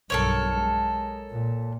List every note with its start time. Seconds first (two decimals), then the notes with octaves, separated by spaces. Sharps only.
0.10 B1 G2 A4 A#4 C#5
0.53 G#3
1.31 A#2